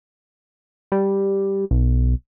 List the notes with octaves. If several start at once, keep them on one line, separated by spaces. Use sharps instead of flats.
G3
B1